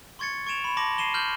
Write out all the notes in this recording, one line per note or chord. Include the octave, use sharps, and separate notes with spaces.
C6 C#6 G#6 A6 C#7
C#6 G#6 D7 E7 F7
B5 E7
A5 C6 D6 A#6 F#7
C6 C7 D#7 E7 G7
F6 G6 F#7 G7